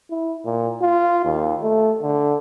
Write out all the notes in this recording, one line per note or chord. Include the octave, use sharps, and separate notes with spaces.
E4
A#2
F4
D#2
A3
D3